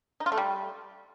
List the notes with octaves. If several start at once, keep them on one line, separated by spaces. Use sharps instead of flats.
D#4
F4
A3
G3